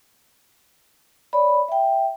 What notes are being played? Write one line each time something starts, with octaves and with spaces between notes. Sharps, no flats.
C#5 D5 B5
E5 G5